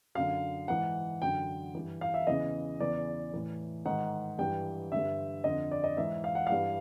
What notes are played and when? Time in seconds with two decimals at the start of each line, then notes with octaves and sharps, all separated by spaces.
0.15 F#2 D3 F5
0.68 G#2 E3 F#5
1.21 F#2 D3 G5
1.75 G2 E3
2.01 F5
2.14 E5
2.27 E2 C#3 E3 D#5
2.80 E2 C#3 E3 D5
3.34 A2 E3
3.85 G#2 D#3 F#5
4.39 G2 E3 G5
4.92 G2 D3 E5
5.44 F2 D3 D#5
5.71 D5
5.84 D#5
5.97 G#2 E3 E5
6.24 F5
6.35 F#5
6.47 G2 E3 F5